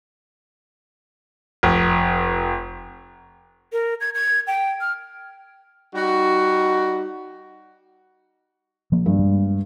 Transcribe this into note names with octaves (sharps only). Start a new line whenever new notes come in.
F1
A#4
G#6
G#6
G5
F6
G3 D#4 F#4
F3 A#3
G2
G3 G#3